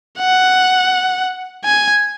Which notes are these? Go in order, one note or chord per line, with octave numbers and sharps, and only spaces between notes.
F#5
G#5